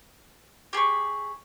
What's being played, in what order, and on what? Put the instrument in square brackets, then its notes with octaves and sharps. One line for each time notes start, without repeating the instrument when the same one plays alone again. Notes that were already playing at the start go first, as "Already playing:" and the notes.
[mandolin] G4 G#4 B5 C#6